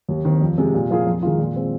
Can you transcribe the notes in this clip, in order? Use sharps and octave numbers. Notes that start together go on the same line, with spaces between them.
D#2
D#3 C4
F2
C3 G#3
A#2
F3 A#3 F4 G#4
F2
D#3 G#3 F4
A#2
G#3 C4